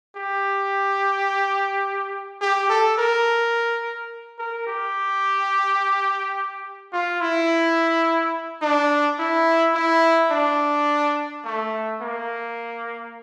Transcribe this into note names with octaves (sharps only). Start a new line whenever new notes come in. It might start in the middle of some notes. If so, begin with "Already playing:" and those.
G4
G4
A4
A#4
A#4
G4
F4
E4
D4
E4
E4
D4
A3
A#3